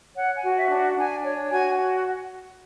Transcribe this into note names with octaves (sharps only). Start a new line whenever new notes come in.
C#5 F#5
G#5
F#4
E5
D4
F#5
D4 G#5
C#5
F#4 G#5